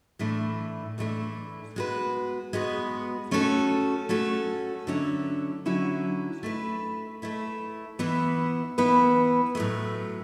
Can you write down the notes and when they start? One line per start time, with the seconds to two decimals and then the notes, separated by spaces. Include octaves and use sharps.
0.19 A2 E3 A3 D4
0.98 A2 E3 A3 D4
1.76 G#3 B3 F#4 B4
2.53 G#3 B3 F#4 B4
3.31 A3 C#4 F#4 A4
4.09 A3 C#4 F#4 A4
4.87 D3 F#3 C#4 E4
5.66 D3 F#3 C#4 E4
6.43 A3 E4 B4
7.22 A3 E4 B4
7.99 E3 B3 E4 B4
8.78 E3 B3 E4 B4
9.55 A2 F#3 A3